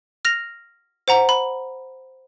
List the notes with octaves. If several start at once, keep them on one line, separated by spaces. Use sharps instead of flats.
F6 A#6 F7
C5 F#5 A#5
B5